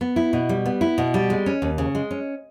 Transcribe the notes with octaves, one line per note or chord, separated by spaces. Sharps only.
B3
E4
B2
G3
B3
E4
B2
G3
G#3
C#4
D#2
C#3
G#3
C#4